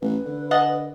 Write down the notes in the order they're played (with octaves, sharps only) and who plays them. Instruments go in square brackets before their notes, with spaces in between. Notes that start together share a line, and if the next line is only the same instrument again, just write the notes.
[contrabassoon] A1 [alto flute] B4
[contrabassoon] D3
[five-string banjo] D#5 F#5 A5